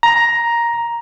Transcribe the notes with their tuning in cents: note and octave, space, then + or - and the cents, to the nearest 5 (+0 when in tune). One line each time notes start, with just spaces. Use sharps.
A#5 +10